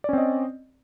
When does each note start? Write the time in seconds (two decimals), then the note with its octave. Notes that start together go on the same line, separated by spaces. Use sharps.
0.04 D5
0.09 C#4
0.13 C4
0.18 D#5